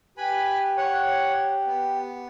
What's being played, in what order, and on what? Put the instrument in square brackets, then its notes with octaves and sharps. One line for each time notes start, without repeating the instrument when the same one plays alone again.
[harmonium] G4 [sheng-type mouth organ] B4 G#5 B5
[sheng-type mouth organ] C#5 F#5
B3